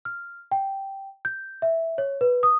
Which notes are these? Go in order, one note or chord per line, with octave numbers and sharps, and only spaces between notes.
F6
G5
G6
E5
C#5
B4
D#6